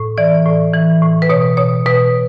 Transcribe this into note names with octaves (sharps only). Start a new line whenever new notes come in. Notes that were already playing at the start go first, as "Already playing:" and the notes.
Already playing: A2
E3 D5
A2
E3
A2
B4
B2 C#5
B2 C#5
B2 B4